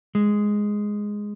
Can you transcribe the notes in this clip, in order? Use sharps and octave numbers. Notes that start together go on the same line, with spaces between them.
G#3